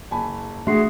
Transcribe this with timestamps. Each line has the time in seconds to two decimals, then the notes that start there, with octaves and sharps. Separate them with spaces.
0.11 F#1 G#5 A5 B5
0.67 E3 A3 D4 F#4 G#4 E5 C6 C7